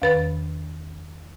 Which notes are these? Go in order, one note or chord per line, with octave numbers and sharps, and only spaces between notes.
E2 D#3 B4 B5 A6